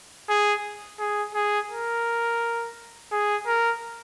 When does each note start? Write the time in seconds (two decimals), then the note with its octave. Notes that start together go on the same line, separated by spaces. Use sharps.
0.29 G#4
0.99 G#4
1.35 G#4
1.71 A#4
3.12 G#4
3.47 A#4